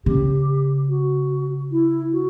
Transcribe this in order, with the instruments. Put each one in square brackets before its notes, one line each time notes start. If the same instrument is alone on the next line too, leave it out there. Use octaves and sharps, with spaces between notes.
[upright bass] C#3 [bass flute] G4
[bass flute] F#4
E4
F#4